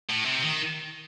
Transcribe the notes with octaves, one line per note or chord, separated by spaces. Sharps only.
A2
C3
D#3